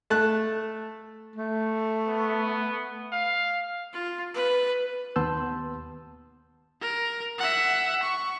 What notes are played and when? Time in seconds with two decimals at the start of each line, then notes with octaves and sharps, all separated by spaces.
0.10 A3 A5 F#6
1.36 A3
2.07 B3
3.13 F5
3.93 F4
4.34 B4
5.16 D#2 B3 A5 C6 E6 G6
6.81 A#4
7.39 E5 F#5
8.03 C#6